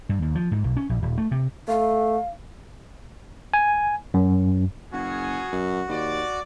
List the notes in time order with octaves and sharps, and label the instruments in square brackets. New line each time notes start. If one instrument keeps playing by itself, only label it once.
[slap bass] G2
D#2
F3
G#2
B1
C#4
A#1
D#1
A3
C3
[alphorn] A3 [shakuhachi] F5
[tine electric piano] G#5
F#2
[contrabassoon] F#1 [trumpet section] B3 C#4 G#4 [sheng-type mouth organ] F#4
[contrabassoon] F#2
[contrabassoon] D#2 [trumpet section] D5